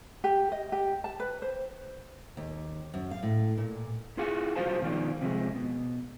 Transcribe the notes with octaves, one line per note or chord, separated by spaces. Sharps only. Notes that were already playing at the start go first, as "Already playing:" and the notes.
G4
D#5
G4
A5
B4
C5
D#2
F#2
F5
A2
A#2
E4 F4 G#4 F5 F#5
B1 D3 F4 F#4 C5 A5
B2 D#3 F3 D4 F4
C3 F3 G#3
B2